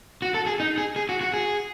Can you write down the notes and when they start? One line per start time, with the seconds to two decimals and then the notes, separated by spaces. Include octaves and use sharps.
0.22 F#4
0.34 A4
0.47 G#4
0.60 D#4
0.78 G#4
0.96 G#4
1.09 F#4
1.21 F#4
1.34 G#4